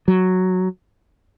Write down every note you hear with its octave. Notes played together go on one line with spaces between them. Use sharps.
F#3